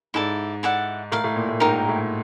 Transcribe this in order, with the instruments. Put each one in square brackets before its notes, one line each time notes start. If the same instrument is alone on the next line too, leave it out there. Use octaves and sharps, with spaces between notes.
[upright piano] G#2 [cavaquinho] E4 A4 D5
[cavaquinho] E4 A4 D5 F#5
[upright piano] A2 [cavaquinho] A#4 D5 F5
[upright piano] A2
A#2
A2
[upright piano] G#2 [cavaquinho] D#4 G4 A#4
[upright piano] A2